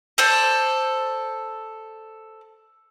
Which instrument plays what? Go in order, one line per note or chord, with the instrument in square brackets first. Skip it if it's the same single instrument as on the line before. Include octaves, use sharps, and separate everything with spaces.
[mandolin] A4 C5 D5